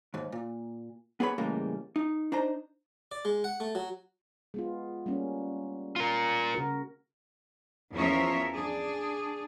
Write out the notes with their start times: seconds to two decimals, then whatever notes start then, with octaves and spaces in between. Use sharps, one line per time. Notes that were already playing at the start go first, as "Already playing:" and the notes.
0.14 D#2 G#2
0.32 A#2
1.20 B3 G#4 B4 C#5 B5
1.38 A2 C#3 E3 G3 G#3 A#3
1.96 D#4
2.32 D4 D#4 C5 A#5
3.12 D5
3.25 G#3
3.44 F#5
3.60 A3
3.75 F#3
4.54 G#3 B3 F4
5.06 G3 A#3 C#4
5.96 F4 A#4
6.54 C#3 F#4 A#4
7.92 E2 F3 C#4 A#4 C#5 E5
8.53 D4 G#4